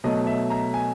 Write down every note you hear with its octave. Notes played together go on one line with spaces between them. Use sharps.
B2 F#3 A3 D#5
E5
A#5
G#5